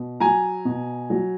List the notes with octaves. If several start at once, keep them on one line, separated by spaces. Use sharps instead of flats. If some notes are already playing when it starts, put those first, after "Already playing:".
Already playing: B2
F#3 G#5 A#5
B2
F#3